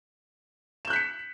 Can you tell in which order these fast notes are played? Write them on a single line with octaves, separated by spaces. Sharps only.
E7 G6 F#6 B6 C#7